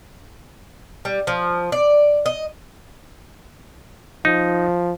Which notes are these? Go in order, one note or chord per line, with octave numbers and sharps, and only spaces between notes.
G3
F3
D5
D#5
F3 D#4